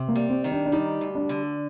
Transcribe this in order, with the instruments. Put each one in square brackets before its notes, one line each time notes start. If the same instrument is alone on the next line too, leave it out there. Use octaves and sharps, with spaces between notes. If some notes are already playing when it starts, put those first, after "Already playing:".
Already playing: [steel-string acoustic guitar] C3
[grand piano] A#3
[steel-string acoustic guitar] G3
[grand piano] C4
[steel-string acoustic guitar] D#3
[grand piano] D4
D4
[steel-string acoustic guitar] G3 [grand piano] D#4
[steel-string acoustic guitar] D2
[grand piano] D4
[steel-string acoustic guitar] D3